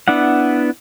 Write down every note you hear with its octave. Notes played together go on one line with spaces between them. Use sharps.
B3 D4 E4 F#5